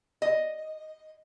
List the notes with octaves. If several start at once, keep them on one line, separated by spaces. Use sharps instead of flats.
D#5